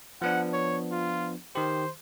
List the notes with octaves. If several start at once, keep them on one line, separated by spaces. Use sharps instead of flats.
F3 B3 D4 F#5
C#5
F4
D#3 G4 C5